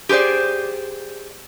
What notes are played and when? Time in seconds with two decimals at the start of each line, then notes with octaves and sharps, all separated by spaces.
0.09 G4 G#4 B4 C5 D5